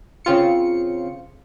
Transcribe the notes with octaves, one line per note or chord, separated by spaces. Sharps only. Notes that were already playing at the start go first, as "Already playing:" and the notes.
C#3 C4 F4 C#7